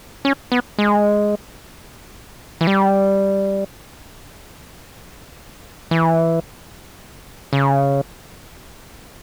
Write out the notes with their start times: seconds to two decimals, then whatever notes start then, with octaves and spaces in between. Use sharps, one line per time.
0.25 C#4
0.52 B3
0.78 G#3
2.61 E3
2.67 G3
5.91 E3
7.53 C#3